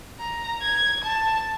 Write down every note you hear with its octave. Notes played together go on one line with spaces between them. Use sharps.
A#5
G#6
A5